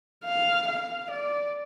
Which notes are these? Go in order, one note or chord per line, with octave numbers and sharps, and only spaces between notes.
F5
F5
D5